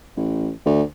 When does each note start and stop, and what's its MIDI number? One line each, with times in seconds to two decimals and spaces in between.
0.17 0.50 33
0.66 0.83 38